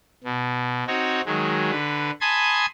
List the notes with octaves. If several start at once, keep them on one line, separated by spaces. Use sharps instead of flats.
B2
C4 D#4 F#4 C#5
D#3 F#3 G#3
D3 B4
G#5 A5 B5 C6 D#6 G#6